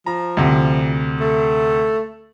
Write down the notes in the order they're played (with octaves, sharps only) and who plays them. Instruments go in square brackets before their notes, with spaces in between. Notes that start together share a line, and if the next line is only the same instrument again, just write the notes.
[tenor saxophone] F3 [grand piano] A#5
[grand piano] D2 C3
[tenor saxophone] A3